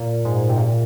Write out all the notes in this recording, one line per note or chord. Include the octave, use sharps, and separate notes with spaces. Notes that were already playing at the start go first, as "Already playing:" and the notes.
Already playing: A#2
G#2
C3
A#2